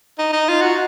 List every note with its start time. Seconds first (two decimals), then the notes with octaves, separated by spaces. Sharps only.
0.18 D#4
0.33 D#4
0.48 F4
0.62 F#4